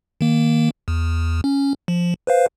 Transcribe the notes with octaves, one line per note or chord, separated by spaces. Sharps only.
D#3 A#3
E2
C#4
F3
B4 C5 F5